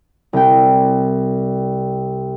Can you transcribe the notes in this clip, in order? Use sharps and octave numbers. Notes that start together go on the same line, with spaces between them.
C2 G5